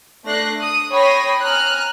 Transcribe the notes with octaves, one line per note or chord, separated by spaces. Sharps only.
A3 D4 F#6 A#6 C7
D#6
C#5 G5 B5 D#6 A#6 C7
G#5 A#5 F6 F#6